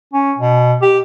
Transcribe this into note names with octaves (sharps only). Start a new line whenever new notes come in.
C#4
B2
G4